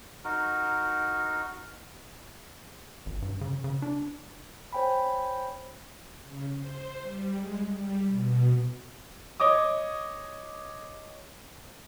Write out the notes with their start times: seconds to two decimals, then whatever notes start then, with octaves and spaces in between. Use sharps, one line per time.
0.24 D#4 F#4 A#4
3.06 G#1
3.22 G2
3.41 C#3
3.64 C#3
3.82 D4
4.73 C5 C#5 G5 G#5 B5
6.23 C#3
6.55 C5
7.01 G3
7.35 G#3
7.70 G3
8.08 B2
9.40 C#5 D#5 D6 D#6